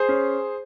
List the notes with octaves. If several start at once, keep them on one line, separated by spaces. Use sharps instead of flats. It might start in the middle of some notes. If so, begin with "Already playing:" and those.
Already playing: G#4 C5
C#4